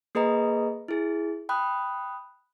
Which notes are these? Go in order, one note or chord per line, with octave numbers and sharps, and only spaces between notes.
A#3 G#4 B4 D#5 A#5
E4 G#4
G5 B5 D#6 F#6